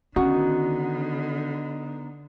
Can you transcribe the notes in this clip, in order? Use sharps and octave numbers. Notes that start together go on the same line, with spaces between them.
D3 D#3 B3 C#4 D#4 F#4